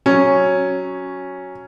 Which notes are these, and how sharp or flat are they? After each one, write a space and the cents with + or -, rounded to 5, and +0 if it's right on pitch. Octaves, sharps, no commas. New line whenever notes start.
F#3 +0 C#4 +0